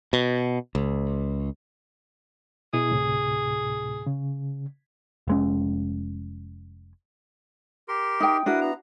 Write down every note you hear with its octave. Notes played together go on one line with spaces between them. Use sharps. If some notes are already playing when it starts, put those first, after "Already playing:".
B2
C#2
B2 E4 G#4
D2 A2 C3
C#3
F1 G#3 C#4
G4 A#4 C6
D#4 G5
D4 E4 F#4 A#4 B4 D#6
B3 A#5